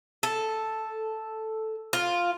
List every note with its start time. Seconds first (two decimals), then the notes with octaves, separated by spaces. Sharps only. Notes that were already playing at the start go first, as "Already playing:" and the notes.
0.23 A4
1.93 F4